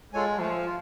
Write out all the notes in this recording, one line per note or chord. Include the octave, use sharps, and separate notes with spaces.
G#3 F4 A4 C#5 G#5
F3 A3
F4